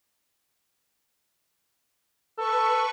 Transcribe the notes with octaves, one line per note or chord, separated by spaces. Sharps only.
A4 B4 C#6